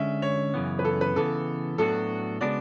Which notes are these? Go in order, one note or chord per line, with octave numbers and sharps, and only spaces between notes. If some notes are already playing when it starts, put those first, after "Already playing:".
Already playing: D3 G#3 C#4 E5
C#5
F#2 C#3 E3 B3
B4
A4
B4
C#3 E3 B3 A4
A2 F#3 B3 D4 F#4 A4
C#3 G#3 B3 D4 F#4 D5